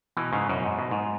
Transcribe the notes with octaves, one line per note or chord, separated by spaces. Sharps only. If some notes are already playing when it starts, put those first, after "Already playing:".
B2 E3
G#2 C#3
F#2 B2
G#2
B2
G#2